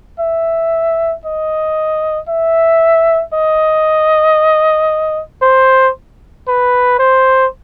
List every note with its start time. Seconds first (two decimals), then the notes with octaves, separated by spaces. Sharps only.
0.20 E5
1.25 D#5
2.29 E5
3.34 D#5
5.42 C5
6.48 B4
6.99 C5